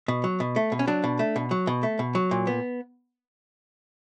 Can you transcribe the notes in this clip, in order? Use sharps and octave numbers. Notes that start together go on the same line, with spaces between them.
B2
F#3
B2
A3
B2
C#4
F#3 D4
B2
A3
B2
F#3
B2
A3
B2
F#3
A#2
B3